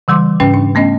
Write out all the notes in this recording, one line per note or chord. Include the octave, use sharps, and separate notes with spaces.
C#3 E3 G3 C6 D6
G#2 C#3 C#4 B4 G5
C#4 D4
A3 B3 C#4 D#5